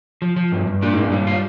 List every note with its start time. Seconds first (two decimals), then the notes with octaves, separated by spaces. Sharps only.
0.22 F3
0.36 F3
0.52 G2
0.67 G2
0.82 A#2 D4
0.93 G#2
0.97 A#2
1.02 G2
1.12 G2 G3
1.27 F4